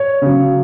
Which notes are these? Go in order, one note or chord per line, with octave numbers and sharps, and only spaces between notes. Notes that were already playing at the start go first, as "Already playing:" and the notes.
Already playing: C#5
C#3 F#3